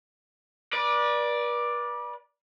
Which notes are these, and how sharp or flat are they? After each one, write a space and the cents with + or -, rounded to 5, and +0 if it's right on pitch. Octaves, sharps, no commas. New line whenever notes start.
B4 -40 D5 +5